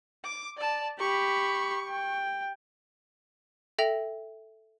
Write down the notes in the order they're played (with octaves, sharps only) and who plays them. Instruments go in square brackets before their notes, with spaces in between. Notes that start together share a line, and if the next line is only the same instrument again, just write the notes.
[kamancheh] D6
D5 A5
[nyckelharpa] G4 B5 [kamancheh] C#6
[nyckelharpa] G5
[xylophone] A4 E5 G5 A#6 F7